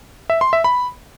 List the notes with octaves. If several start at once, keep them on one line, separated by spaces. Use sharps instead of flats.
E5
C6
E5
B5